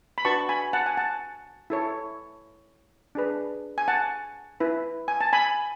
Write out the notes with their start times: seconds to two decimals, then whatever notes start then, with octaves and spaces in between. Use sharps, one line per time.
0.18 B5
0.25 D4 F#4 B4 A5 C#6
0.49 G#5 B5
0.73 F#5 A5
0.86 G#5
0.97 F#5 A5
1.70 E4 A4 C#5
3.15 D4 G#4 B4
3.78 G#5
3.88 F#5 A5
4.60 E4 B4
5.08 G#5
5.21 A5
5.33 G#5 B5